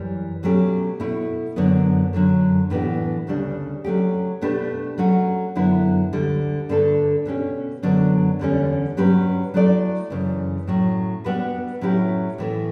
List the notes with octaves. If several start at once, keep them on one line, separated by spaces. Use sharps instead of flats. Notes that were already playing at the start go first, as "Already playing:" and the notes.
Already playing: F#2 E3 G3
B2 F#3 A3 C#4 G4
B2 A3 E4
F#2 D3 F#3 B3
F#2 D3 F#3 A3
A2 E3 B3 D4 G4
D2 C#3 G3 D4
F#3 A3 C#4 G4
B2 A3 D4 G4 B4
F#3 A3 C#4 F#4
F#2 D3 F#3 B3 E4
D2 D3 G3
G2 D3 A3 D4 A4
B2 A3 C#4 G4
F#2 D3 F#3 B3 D4
E2 D3 G3 C#4
G2 F#3 C#4 G4 B4
F#3 A3 E4 A4 D5
F#2 C#3 E3
A2 F#3 C#4
G3 B3 D4 F#4 B4
A2 F#3 C#4 E4 G4
A2 E3 A3